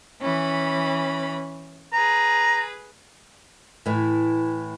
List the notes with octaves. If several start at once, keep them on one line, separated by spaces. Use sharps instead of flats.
E3 C#4 B5
G#4 B4 A#5
A2 E3